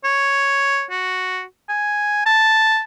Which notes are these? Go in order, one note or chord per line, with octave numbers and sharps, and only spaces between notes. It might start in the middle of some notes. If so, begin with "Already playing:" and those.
C#5
F#4
G#5
A5